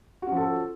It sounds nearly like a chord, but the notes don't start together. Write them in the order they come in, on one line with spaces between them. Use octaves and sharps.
F#4 C#4 F3 A4